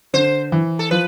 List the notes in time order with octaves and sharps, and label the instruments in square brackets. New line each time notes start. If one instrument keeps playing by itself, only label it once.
[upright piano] D3 [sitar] C5
[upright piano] E3
[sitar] A4
[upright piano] F3 [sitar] B4